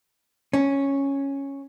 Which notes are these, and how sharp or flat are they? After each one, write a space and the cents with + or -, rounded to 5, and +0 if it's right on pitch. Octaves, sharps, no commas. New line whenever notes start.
C#4 -5